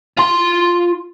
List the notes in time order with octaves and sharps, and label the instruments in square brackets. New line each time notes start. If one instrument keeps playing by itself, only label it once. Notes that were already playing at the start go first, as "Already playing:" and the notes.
[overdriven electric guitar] F4 C6